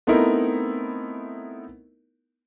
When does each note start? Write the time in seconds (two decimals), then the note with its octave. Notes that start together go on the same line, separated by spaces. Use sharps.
0.07 A3 B3 C4 D#4 E4 A#4